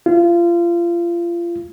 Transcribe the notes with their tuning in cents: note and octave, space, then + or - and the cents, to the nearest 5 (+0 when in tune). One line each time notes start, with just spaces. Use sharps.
F4 -30